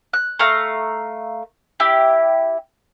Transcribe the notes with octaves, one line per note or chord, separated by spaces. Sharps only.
F#6
A3 F5 A#5 F6
E4 G4